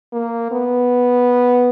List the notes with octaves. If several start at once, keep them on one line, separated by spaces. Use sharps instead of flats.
A#3
B3